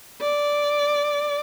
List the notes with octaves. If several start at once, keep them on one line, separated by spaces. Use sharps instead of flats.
D5